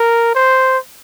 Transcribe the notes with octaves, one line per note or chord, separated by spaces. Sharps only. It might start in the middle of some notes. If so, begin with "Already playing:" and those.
Already playing: A#4
C5